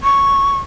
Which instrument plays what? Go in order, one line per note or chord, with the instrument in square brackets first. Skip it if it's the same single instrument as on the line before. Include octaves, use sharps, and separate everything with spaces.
[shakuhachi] C#6